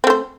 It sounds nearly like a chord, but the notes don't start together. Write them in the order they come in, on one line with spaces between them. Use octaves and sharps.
C4 A3 C5